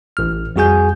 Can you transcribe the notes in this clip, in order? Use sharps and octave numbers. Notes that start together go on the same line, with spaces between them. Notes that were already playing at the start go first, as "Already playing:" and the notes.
A1 F6
F2 G3 F#4 G#4 G#5 G6